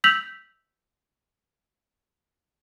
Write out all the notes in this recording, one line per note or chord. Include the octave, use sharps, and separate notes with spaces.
E6 G6 B6 F7 F#7